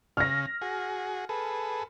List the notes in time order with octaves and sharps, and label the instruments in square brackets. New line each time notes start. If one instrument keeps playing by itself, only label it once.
[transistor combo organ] C#3 [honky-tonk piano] F6 A#6
[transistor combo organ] F#4 G#4
G#4 A4 B4